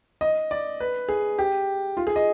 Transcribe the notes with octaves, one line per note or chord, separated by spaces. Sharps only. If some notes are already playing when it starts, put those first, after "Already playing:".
D#5
D5
B4
G#4
G4
F4
G#4
D#5